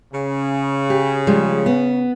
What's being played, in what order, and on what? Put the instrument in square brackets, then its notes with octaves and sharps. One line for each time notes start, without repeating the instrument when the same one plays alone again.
[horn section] C#3
[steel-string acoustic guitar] G4
F3 G3 G#3
B3